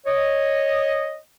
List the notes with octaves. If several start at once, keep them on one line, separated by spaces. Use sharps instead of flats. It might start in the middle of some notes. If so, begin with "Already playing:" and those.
C#5 D#5